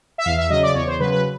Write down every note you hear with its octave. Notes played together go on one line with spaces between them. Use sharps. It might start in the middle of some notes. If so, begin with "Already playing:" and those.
E5
E2 F5
E5
C#3 F#3 D#5
D5
E2 C#5
C5
C#3 F#3 B4
B4